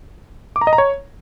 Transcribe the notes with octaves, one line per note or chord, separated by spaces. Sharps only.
D6
A#5
D#5
A#5
C#5